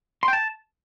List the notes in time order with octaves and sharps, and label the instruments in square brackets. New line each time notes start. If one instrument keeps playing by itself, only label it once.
[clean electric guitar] C6
G5
A5